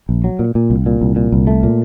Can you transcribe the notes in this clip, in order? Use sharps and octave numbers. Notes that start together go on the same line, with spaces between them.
A#1
F#3
A#2
A#2
C2
A#2
C2
A#2
C2
A3
A#2